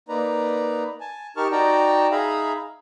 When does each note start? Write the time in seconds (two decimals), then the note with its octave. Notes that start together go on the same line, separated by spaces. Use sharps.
0.09 A#3 D#4 B4 D5 A#5
1.01 G#5 A5
1.37 D#4 G4 A#4 A5 C#6 F6
1.52 D#4 F#4 D5 G5 A5 A#5
2.11 D#4 G#4 E5 F5 A#5 B5